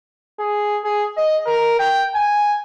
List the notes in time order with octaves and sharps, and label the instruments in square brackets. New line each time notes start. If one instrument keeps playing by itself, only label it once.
[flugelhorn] G#4
G#4
D#5
A#4
G5
G#5